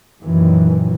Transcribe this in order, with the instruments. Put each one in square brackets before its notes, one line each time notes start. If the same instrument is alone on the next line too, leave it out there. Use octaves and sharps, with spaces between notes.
[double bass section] F#2 A#2 D#3 E3